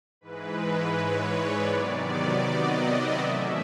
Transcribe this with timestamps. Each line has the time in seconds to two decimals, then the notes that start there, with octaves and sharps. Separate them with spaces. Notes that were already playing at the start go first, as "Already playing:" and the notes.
0.21 G#2 E3 G#3 B4
0.95 C#5
1.33 D5
1.71 C3 D#3 F#3 B3
2.08 D5
2.45 D#5
2.82 E5
3.20 A2 E3 A3 C#4 E5